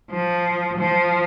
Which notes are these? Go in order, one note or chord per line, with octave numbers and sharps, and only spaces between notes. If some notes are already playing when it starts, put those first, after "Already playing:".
F3
F3